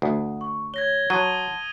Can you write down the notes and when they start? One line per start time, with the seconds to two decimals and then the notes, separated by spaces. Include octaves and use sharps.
0.02 D2 F#5 D#6
0.41 C#6
0.74 C#5 G#6 A#6 G7
1.10 F#3 F#5 A5 C6 D#6 D#7 G7